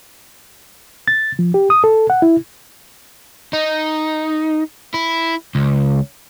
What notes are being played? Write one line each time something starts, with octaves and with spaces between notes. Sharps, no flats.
A6
F3
G4
D#6
A4
F#5
E4
D#4
E4
C#2